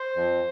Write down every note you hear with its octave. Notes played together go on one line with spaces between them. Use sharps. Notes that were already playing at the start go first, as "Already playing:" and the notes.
Already playing: C5
F2